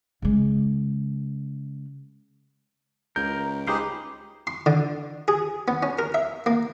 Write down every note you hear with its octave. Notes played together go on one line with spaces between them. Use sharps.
C#3 G#3
C#2 A#4 G6
C#2 D#4 G4 G#4 B4 C5 F5
C6
D3
G#4
B3
C#4
A#4
E5
A#3